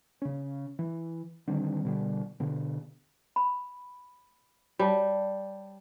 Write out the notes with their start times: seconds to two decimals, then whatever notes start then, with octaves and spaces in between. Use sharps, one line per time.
0.22 C#3 C#4
0.79 E3
1.47 D3 D#3 G3 C4
1.85 B2 D3 G3
2.40 B2 D3
3.36 B5
4.79 G3 C#5 A5